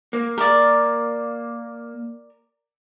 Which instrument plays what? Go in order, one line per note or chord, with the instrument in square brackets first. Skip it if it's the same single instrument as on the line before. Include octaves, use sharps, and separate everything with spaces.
[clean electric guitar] A#3
[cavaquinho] A#4 D5